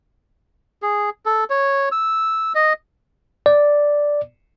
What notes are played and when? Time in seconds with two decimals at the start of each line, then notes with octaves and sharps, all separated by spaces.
0.82 G#4
1.26 A4
1.50 C#5
1.92 E6
2.55 D#5
3.46 D5